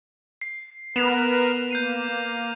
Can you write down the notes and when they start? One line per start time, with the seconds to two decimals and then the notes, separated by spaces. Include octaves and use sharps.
0.41 C7
0.96 B3 A#4 B4 E7 F7
1.71 A#3 G6 C7 D#7